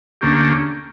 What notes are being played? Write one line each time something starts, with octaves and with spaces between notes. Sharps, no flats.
D2 D3 A#3 C#4 G4